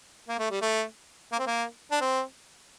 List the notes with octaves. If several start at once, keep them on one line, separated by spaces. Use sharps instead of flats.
A#3
A3
G3
A3
A#3
C4
A#3
D4
C4